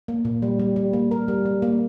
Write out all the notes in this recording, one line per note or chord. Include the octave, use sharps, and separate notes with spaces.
A#3
A#2
G3
G3
G3
A#3
A#4
G3
G3
A#3